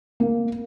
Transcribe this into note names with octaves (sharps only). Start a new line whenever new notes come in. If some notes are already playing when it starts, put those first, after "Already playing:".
A#3